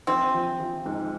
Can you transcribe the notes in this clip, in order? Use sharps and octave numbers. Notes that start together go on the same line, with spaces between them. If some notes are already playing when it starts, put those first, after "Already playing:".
A#1 C4
F3
F3
G#2